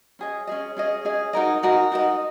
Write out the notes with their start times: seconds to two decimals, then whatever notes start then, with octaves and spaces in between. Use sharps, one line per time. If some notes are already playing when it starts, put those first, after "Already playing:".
0.19 C#4 G#4 D#5
0.47 C#4 G#4 D#5
0.77 C#4 G#4 D#5
1.05 C#4 G#4 D#5
1.33 D#4 F#4 A#4 D#5
1.63 D#4 F#4 A#4 D#5
1.92 D#4 F#4 A#4 D#5